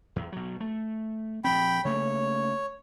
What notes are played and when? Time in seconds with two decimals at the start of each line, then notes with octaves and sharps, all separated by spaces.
0.16 E2
0.32 B2 F#3
0.60 A3
1.44 A#1 F3 C4 G5 B5
1.85 C#3 A3 A#3 C#5